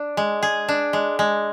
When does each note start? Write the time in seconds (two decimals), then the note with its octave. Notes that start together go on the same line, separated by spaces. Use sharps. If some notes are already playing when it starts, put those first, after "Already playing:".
Already playing: D4
0.17 G#3
0.43 G#4
0.68 D4
0.93 G#3
1.19 G#3